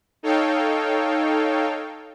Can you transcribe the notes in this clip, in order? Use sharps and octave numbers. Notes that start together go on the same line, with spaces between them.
D#4 A4 C#5 F5 G5